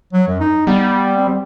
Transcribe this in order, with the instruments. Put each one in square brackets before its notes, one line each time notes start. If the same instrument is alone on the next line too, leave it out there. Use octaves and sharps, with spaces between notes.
[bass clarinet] F#3
F#2
D#4
[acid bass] G3 [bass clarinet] B3
[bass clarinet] C4